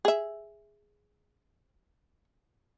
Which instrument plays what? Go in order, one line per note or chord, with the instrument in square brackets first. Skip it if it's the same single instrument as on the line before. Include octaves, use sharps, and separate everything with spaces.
[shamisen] G#4 E5